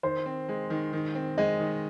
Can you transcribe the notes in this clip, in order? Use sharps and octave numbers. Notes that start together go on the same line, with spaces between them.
D#3 C5
C4
G#3
D#3
D#3
C4
G#3 D#5
D#3